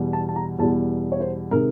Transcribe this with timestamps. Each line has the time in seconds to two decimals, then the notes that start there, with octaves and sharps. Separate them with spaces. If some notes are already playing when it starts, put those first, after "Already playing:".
Already playing: E2 B2 G3
0.13 A5
0.29 A5
0.36 A#5
0.59 E2 B2 G3 A5
1.12 C#5
1.20 C5
1.51 C3 D#3 G#3 A#4